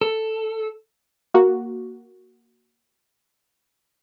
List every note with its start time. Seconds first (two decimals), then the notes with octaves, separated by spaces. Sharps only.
0.01 A4
1.34 A#3 F#4